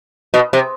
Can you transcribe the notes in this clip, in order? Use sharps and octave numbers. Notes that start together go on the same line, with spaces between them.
B2
C3